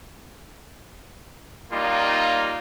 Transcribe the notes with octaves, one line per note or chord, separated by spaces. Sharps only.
G3 A#3 D#4 F4